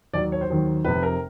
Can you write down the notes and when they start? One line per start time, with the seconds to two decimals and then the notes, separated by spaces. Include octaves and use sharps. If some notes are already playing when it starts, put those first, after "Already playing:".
0.14 D#2 D#3 F#3 D5
0.32 C#5
0.41 C5
0.50 D#2 D#3 F#3
0.85 F1 F2 C3 B4
1.03 A#4